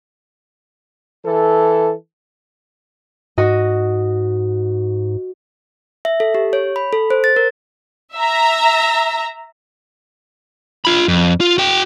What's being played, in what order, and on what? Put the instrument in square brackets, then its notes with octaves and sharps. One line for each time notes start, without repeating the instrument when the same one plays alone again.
[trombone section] E3 A4
[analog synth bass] G#2 [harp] F#4 D#5
[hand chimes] E5
A4
G4
C#5
B5
A4
C5
A6
A#4
[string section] E5 A#5
[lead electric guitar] F4 B5
F2
F4
F#4 G5